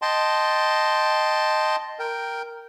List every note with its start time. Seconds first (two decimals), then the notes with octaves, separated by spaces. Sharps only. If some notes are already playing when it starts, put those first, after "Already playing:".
0.02 D#5 G5 A5 C6
1.99 A#4 G5